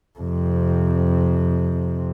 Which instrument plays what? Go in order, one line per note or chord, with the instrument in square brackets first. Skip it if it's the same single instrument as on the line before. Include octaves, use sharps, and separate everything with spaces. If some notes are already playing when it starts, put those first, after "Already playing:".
[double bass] F2 C3